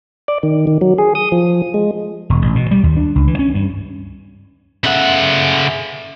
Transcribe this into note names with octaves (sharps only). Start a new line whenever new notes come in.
D5
D#3
D#3
F#3
G#4
D#6
F3
G#3
E1
A1
B2
G3
D#2
D4
C#2
E3
C#4
G2
C#3 A3 B3 E5 F#5